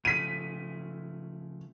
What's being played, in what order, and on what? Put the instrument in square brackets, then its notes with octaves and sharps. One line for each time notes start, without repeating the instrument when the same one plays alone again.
[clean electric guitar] C#3 F3 A3 [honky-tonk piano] B6 D#7